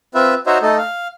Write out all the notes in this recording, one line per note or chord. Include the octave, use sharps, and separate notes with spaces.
C4 F4 B4 E5
D#4 F#4 C5 C#5 D#5 E5
A3 D#4 A4 D#5
F5